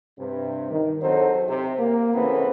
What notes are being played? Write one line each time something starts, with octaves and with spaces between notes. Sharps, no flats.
G2 C3
D#3
E2 F#3 C4 D#4 A4 C5
C3
A#3
C2 A2 C#3 E3 B3 C4